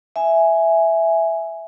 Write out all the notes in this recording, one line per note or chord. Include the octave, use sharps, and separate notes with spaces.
E5 G#5